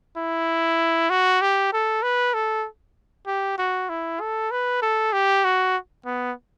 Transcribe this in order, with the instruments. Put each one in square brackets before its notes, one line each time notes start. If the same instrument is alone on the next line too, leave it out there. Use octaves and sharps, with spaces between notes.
[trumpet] E4
F#4
G4
A4
B4
A4
G4
F#4
E4
A4
B4
A4
G4
F#4
B3